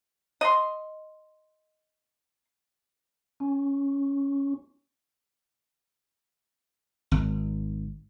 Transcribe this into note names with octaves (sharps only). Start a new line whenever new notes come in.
D#5 C6
C#4
G#1